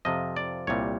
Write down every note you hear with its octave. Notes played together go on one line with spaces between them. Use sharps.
F2 C3 F3 D#5
D5
C2 A#2 G3 C#5